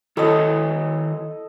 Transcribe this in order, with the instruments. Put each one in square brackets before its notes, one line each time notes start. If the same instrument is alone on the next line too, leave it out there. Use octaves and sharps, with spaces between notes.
[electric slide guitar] D#3 E4 C#5 [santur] A4 D#5